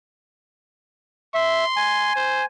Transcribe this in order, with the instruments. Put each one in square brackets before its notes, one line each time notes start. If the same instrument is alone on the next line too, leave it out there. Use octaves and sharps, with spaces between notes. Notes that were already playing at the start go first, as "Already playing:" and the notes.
[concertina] E5 [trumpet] C6
[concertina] G#5
[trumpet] C5